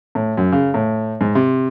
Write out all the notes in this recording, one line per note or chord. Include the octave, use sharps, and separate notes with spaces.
A2
F#2
C#3
A2
G#2
C3